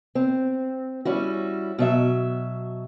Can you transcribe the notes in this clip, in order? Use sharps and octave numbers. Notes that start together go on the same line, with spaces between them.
C4
G3 C#4 E4 F#4
B2 F#3 E5